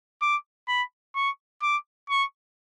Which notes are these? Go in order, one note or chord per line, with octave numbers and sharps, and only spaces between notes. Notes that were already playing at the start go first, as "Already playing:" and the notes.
D6
B5
C#6
D6
C#6